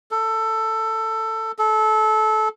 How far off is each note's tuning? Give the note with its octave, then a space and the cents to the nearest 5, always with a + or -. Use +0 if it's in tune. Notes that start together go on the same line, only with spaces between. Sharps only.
A4 +15
A4 -20